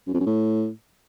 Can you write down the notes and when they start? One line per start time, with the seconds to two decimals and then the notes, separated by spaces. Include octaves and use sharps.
0.07 F#2
0.14 F2
0.20 F#2
0.26 A2